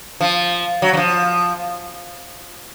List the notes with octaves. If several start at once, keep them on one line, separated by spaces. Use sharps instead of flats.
F3
F#3
F#3
F3